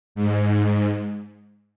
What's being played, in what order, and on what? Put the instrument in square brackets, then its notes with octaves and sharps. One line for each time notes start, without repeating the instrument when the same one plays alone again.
[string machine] G#2